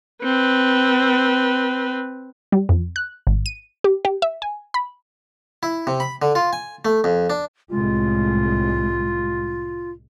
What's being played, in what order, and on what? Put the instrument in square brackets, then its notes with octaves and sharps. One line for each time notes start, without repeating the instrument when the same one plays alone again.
[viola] C4 B4
[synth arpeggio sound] G3
F2
F#6
G#1
D#7
G4
G4
E5
G#5
B5
[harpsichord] E4
C3
B5
D3
F4
G#5
A3
F2
D4
[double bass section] C2 A2 G#3 [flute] F4